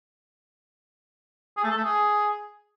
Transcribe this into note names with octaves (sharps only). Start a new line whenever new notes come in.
G#4
A3
A4
A3
G#4